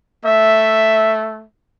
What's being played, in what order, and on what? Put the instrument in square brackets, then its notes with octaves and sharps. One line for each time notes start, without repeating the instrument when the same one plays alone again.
[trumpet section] A3 E5